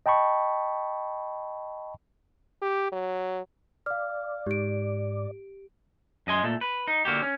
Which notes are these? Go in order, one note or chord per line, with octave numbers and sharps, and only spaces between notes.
D#5 G5 A5 B5 C#6
G4
F#3
D5 F5 F6
G#2 G4 D7
F#2 D#5 G#5 C6
A#2 A3
B4
D#4
D3 A#3 F#4 G4
C#4